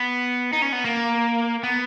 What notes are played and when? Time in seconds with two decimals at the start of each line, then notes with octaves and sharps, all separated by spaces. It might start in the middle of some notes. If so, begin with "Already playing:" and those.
Already playing: B3
0.53 D#4
0.62 C#4
0.73 B3
0.85 A#3
1.63 B3